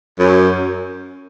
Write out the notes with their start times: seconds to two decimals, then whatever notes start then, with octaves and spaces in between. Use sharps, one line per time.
0.19 F#2